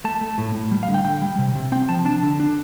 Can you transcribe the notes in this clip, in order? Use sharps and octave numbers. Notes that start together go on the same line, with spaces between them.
A3 A5
A3
A2
A2
G3
F5
D3
G5
D3 G5
G3
C3
C3
C4 G5
F3 A5
D4 A5
D3
D4